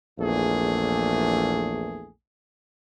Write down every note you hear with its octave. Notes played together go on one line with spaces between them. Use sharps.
A#1 E2 E3 A3 G#4